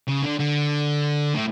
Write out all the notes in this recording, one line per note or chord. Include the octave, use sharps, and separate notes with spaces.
C#3
D3
D3
A2